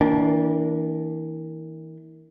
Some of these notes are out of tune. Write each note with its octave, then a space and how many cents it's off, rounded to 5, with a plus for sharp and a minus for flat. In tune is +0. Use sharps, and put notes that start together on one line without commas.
E3 -35 A#3 +0 D4 -20